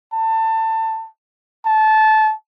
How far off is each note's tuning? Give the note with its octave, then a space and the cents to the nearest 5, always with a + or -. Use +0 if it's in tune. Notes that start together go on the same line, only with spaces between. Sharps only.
A5 +25
A5 -20